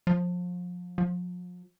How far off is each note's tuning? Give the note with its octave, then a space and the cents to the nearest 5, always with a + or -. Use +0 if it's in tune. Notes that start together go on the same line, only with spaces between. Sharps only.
F3 +30
F3 +40